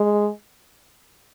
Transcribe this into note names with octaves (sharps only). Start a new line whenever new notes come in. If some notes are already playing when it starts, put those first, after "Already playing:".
Already playing: G#3